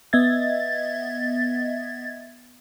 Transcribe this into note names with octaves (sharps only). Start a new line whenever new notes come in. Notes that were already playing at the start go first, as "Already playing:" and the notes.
B3 D#5 E5 G#6 A6